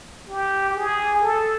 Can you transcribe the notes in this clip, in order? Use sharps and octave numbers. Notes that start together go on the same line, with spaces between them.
G4
G#4
A4